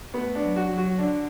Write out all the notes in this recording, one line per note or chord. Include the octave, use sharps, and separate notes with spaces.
A3 B3
D4
F#3
F#4
F#3
F#4
D3 D4